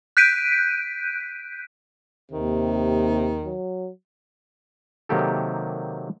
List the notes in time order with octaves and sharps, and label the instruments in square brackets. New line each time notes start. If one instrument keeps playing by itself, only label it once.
[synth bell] F#6 G6 B6 D7 D#7
[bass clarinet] D#2 [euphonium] C3 [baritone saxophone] D#3
[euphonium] F#3
[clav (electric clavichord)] C3 D#3 F#3 A#3 G4 A4